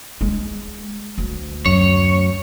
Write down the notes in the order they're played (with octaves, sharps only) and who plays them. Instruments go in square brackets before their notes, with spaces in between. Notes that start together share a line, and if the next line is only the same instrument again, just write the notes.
[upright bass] G#3
D2
[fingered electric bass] F#2 [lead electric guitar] C#5